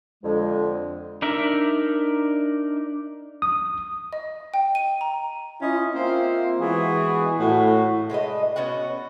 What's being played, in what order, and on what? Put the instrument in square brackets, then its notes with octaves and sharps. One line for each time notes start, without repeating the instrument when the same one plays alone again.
[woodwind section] F2 D3 G#3
[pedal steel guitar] D4 D#4 A#4 E5
[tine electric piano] D#6
[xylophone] D#5
G5
D#7
A#5
[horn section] C#4 E4 F4 D#5
A#3 C4 F4 C5 E5 F5
E3 G#3 B3 F#4 G#4
A2 F#4
[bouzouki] G#3 D4 B4 D#5
B3 C#4 F#4 F#5